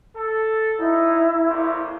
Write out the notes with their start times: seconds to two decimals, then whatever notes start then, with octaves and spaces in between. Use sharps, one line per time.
0.15 A4
0.79 F#3 D#4 E4
1.47 A#1 F2 C3